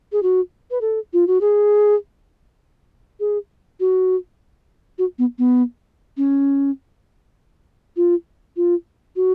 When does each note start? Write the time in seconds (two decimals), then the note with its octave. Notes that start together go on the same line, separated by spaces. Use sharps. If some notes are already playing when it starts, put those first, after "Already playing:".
0.12 G#4
0.23 F#4
0.71 B4
0.81 A4
1.13 F4
1.27 F#4
1.41 G#4
3.20 G#4
3.80 F#4
4.98 F#4
5.18 B3
5.38 B3
6.17 C#4
7.96 F4
8.56 F4
9.16 F#4